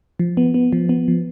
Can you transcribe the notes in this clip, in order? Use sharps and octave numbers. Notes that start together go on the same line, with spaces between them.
F3
B3
B3
F3
B3
F3